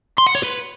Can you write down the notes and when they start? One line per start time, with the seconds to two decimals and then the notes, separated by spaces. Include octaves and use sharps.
0.18 C6
0.27 F#5
0.35 C#5
0.43 B4